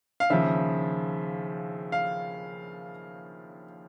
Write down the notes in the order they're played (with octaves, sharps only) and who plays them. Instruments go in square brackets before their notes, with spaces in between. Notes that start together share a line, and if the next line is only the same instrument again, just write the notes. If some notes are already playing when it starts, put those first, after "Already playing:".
[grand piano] F5
D#2 C#3 F3 E5
F5